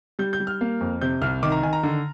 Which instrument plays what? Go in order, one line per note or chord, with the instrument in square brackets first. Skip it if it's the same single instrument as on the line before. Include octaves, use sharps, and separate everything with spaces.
[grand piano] G3 G6
G6
G3
F6
A#3
F2
C3 G6
C2 F6
D#3 D6
A#5
D#3 G#5
A#5
D3